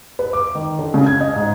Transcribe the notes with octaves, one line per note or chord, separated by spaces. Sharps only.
B4
D6
D#3
D3
C#3
G#6
D#5
G#2